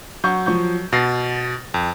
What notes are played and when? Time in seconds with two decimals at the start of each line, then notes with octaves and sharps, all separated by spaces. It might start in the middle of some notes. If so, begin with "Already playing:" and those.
0.24 F#3 F#5 C#6 G6
0.46 F3 C#6 G6
0.93 B2 A6 A#6 C7
1.74 F2